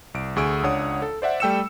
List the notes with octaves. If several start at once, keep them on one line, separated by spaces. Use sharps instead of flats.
C2 D7
D2 G#4 C#6 D#6 E6 D7
C#2 D4 C#5 F#5 D#6
A4
C5 D5 E5 F#5
G3 A3 G5 E6 C#7 E7